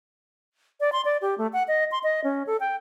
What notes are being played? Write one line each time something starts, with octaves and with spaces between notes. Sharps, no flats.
D5
C6
D5
G4
A3
F#5
D#5
C6
D#5
C#4
A4
G5